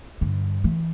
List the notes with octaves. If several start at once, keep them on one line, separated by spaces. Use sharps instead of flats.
G2 D3
E3